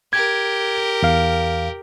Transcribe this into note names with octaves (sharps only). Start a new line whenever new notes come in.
G4 A#4 G#6
E2 F5